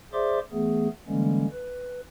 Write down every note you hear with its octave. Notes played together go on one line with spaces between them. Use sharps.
G#4 C5 D5 E5 C6 D6
E3 A3 B3 G#4
D3 E3 G3 G#3 A#3 C#4
B4